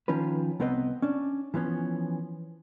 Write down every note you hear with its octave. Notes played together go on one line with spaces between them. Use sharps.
D#3 F3 C#4 F4 B4
C2 B3 C4 B4 D#5
C#4 D4
E3 F3 B3 C#4